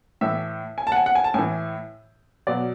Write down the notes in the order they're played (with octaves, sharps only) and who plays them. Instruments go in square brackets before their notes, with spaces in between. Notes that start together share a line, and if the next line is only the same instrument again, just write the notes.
[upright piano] A2 E3 E5
G#5
A5
F#5
G#5
F#5
G#5
A5
A2 E3 G#5
B2 F#3 D5